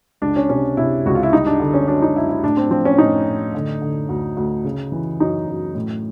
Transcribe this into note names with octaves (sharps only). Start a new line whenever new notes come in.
C#2 D4
C#4
C3 C#4
C3 E4
C#2 F#4
F4
E4
G3 D#4
D4
D3
C#4
F#2 D4
D#4
F#2 E4
E4
A2 D4
C4
F3 C4
C#4
A2 D#4
A2
D3
D3
D2
D2
C#3
E3
F#2 D#4
F#2
A2